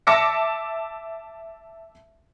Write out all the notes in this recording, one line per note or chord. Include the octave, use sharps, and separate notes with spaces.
E5 A5 D6 E6 A#6 C#7